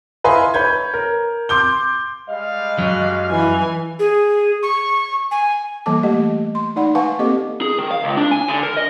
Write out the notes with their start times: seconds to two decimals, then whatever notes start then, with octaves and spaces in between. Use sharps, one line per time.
0.24 E4 B4 D#5 F5 G#5 C6
0.54 B4 C#5 G6 G#6
0.94 A#4
1.49 C6 D6 G6 G7
2.30 G3 G#3 D#5 F5
2.79 F#2 F#3
3.30 E3 G#5
3.99 G#4
4.63 C#6
5.31 G#5
5.86 E3 G3 A#3 A4 A5 D6
6.03 A3 A#3 G4 D#5
6.55 C6
6.76 D#4 D5 F#5 B5
6.95 B4 F5 F#5 G#5 A5 C#6
7.19 A#3 C4 G4 A4 D#5 D6
7.62 G#4
7.79 D#3
7.91 F5
8.04 C#2
8.17 D4
8.31 G#5
8.48 D3
8.63 A#4
8.76 D#5